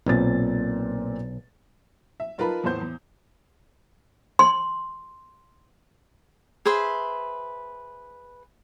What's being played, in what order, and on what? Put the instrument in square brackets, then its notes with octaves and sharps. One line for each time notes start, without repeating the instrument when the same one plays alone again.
[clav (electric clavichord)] B1 [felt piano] A#2 C4 A6
[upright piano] E5
D#4 F4 A#4 B4 A5 B5
E2 A2 B3 C5 G6
E2
[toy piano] C6
[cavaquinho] G#4 B4 C5 E5